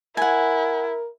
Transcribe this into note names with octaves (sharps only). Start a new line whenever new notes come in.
E4 A#4 F#5 G#5